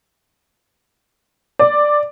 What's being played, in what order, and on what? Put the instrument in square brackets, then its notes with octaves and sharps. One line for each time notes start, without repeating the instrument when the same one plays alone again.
[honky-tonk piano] D5